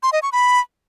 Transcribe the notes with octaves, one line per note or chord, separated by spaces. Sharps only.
C6
D#5
C#6
B5